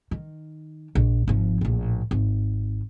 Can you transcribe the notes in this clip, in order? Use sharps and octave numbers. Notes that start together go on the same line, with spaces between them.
D#3
A#1
G#1 F3
A#1 A2
G#1